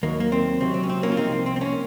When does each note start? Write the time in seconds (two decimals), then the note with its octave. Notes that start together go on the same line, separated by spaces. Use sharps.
0.03 D#2 D#3 F#3 A#3
0.20 A#3
0.32 C4
0.60 C#2 C3 F#3 C4
0.74 C4
0.83 C#4
0.89 C4
1.03 A#3 C#4
1.12 F4
1.17 C2 C3 F3 C4 D#4
1.32 C4
1.46 C4
1.56 C4
1.61 A#3 C#4